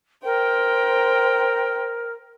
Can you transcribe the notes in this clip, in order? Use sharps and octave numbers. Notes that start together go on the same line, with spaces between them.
A#4 C5 G5